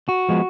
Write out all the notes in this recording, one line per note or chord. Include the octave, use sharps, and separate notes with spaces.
F#4
F3 G#3 B3